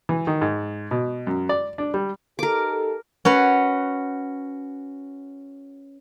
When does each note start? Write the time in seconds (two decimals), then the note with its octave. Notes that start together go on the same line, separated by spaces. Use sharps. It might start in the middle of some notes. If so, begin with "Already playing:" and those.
0.09 E3
0.27 D#3
0.41 G#2
0.91 B2
1.27 F#2
1.49 D5
1.78 D4
1.94 G3
2.39 D#4 G4 A4 A#4 D6
3.25 C#4 F#4 B4